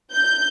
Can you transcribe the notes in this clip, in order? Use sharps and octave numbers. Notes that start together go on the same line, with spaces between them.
G6